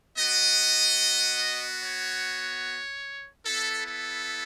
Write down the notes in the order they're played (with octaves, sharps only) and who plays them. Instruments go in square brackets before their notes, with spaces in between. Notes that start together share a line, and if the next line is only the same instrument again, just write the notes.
[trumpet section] B3 F#4 D#5
C#5
B3 E4 A4
A4